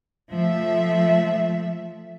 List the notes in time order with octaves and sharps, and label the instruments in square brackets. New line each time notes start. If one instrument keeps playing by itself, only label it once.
[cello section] F3 A3 E5